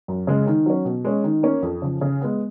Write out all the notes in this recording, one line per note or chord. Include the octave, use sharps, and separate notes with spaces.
F#2
C#3 G#3
D#3
F#3 C#4
B2
G#3 C#4
D#3
A#3 C#4
F2
C#3 F3
C#3
G#3 B3